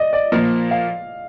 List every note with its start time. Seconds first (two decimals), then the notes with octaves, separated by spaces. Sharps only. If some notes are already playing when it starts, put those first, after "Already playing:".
Already playing: D5 D#5
0.13 D5
0.32 A#2 F3 A#3
0.71 F5